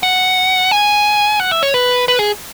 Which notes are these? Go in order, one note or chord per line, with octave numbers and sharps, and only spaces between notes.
F#5
G#5
F#5
E5
C#5
B4
B4
G#4